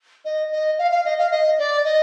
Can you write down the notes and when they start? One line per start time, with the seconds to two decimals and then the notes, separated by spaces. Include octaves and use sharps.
0.25 D#5
0.52 D#5
0.78 F5
0.91 F5
1.05 D#5
1.18 F5
1.31 D#5
1.58 D5
1.84 D#5